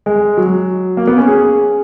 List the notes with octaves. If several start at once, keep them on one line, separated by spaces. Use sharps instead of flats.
G#3
F#3
A#3
B3
C#4
G#4